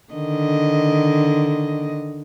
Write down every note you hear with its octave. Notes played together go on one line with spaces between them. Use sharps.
D3 D#3 D#5